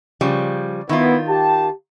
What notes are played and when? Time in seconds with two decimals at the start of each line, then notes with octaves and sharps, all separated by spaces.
0.21 C#3 F3 G3
0.89 D#3 B3 E4 F4
1.28 G4 A5